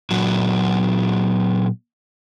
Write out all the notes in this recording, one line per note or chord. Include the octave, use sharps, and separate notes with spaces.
A#2 F#3 F#4